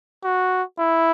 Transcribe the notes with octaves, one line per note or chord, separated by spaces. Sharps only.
F#4
E4